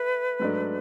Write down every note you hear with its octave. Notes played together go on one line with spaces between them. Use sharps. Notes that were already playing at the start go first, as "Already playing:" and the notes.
Already playing: A3 B4
G#2 F#3 A3 D4